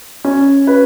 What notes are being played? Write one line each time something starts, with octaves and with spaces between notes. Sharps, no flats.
C#4
B4